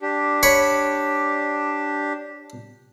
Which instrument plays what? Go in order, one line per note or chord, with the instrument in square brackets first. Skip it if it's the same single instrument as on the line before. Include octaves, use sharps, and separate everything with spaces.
[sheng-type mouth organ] D4 G4
[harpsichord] C#5 B5